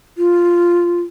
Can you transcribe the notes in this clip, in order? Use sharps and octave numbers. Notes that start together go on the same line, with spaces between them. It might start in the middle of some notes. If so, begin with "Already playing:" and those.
F4